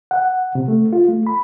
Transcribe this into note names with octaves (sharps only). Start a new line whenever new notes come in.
F#5
C3
A3
F4
A3
B5